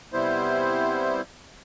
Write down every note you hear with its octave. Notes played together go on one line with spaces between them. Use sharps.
C3 G3 B3 E4 C5